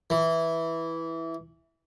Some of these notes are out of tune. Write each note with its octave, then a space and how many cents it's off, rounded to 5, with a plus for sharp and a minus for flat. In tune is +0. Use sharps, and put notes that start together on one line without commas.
E3 -5